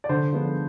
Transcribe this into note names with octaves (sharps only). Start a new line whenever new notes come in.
D5
D3 C5
F3 G#3 B3 D4